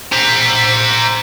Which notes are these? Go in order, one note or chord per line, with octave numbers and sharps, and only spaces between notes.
C5 A#5